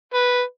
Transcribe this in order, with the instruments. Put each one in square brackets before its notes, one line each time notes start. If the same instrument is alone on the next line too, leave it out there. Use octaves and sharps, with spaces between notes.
[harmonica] B4